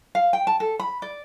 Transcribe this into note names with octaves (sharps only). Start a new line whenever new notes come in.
F5
G5
A5
A4
B5
D5